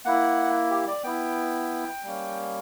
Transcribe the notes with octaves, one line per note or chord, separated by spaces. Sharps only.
A#3 E4 F#5
G4
D5
B3 E4 G5
G3 A#3 C#4